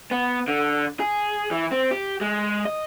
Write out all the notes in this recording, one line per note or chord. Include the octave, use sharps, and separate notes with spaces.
B3
D3
G#4
E3
C4
G4
G#3
D#5